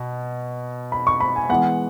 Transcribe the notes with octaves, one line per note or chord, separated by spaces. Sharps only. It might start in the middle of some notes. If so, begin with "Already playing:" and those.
Already playing: B2
B5
C#6
B5
G#5
E3 G#3 B3 F#5